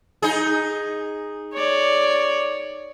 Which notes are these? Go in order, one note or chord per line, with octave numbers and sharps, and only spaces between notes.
D#4 G#4
C#5 D5